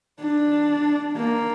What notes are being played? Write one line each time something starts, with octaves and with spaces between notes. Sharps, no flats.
D4
A#3